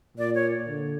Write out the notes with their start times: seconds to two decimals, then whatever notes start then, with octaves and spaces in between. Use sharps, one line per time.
0.17 A#2 D5
0.35 C#5
0.69 D3